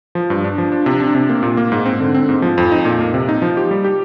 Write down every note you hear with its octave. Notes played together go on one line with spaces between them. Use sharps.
F3
G2
D4
F3
D4
C3
D4
C3
A#3
A#2
A#3
G#2
C4
D3
C4
G#2
F3
F2
D#4
A#2
A#3
C3
D#4
F3
G4
G3
G4